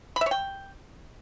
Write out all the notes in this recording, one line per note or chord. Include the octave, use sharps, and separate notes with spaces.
B5
E5
C#5
G5